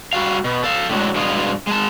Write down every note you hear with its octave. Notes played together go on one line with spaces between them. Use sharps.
G3 F#4 F5
B2
A4 F5
A2 D3 F#3 G#3
G2 B2 G#3 F4
G#3 A5